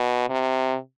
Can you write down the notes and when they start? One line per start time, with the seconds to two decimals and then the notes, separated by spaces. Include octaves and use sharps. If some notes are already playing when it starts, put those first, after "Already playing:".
Already playing: B2
0.30 C3